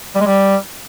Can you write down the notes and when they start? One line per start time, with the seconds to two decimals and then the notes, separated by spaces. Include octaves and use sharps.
0.15 G3
0.21 G#3
0.26 G3